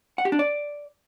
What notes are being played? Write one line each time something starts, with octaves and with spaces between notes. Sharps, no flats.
F#5
G4
D4
D5